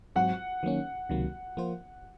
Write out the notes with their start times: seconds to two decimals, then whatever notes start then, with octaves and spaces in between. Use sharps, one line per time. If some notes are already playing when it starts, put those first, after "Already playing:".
0.16 G#2 F#3 C4 F#4 F#5
0.63 D#3 F#3 A#3 C#4
1.09 C#2 C3 D#3 F#3 A#3
1.57 F3 A#3 F4 C5